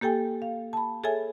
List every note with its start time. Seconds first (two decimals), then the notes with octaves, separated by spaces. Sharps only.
0.01 A#3 G4 A4 G5 G#5
0.42 F5
0.73 A5 B5
1.04 G#4 A4 C#5 E5 G#5